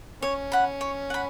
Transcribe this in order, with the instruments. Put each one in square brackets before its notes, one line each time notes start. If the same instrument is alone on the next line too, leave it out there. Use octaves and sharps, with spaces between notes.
[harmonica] C#4 [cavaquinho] C#5
[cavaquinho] F#5 B5
C#5
F#5 B5